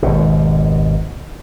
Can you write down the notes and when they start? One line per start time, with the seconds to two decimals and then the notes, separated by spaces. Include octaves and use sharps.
0.02 G#1 D#2 B2